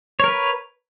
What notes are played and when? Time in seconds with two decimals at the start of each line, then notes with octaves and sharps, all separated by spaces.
0.20 C#5
0.24 A#4
0.28 B4